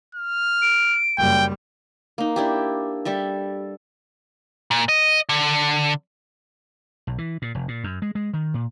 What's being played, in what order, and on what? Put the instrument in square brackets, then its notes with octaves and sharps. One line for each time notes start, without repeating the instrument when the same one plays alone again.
[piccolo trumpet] F6
[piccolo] D7
[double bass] F#1 G3 [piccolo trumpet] G5
[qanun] A#3 D#4
D4 E4 G4
G3 A4 E5
[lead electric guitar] A#2
D#5
D3
[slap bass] B1
E3
A#2
F1
A#2
F#2
G#3
G#3
D#3
A#2